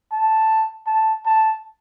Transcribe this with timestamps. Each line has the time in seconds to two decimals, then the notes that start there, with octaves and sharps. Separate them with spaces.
0.12 A5
0.87 A5
1.26 A5